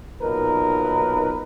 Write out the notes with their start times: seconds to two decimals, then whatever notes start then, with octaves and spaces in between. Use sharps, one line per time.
0.22 B1 A#2 D#4 A#4 B4